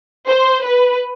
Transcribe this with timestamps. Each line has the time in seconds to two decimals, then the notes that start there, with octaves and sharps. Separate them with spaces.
0.27 C5
0.63 B4